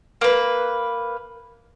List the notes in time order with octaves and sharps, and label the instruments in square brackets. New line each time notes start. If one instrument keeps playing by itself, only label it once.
[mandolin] A#3 B4